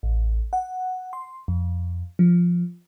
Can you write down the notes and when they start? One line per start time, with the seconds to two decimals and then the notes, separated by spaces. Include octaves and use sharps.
0.03 A1
0.53 F#5
1.13 C6
1.48 F2
2.19 F3